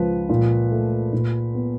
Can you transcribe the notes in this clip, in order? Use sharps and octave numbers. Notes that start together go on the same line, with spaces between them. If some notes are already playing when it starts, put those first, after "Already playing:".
Already playing: C#2 F3 B4
A#2
A3
A#2
B3